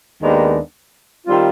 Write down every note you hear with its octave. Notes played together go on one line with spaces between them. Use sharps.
D#2 D#3 G#3 B3 D4
D#3 G3 C4 F4